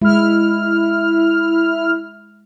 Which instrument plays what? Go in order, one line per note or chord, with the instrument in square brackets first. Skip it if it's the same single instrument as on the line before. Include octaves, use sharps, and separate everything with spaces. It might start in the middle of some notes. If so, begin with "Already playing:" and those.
[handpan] G#3 [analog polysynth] E4 F6